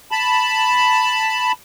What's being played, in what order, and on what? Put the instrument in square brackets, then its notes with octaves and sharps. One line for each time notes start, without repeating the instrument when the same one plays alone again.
[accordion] A5 B5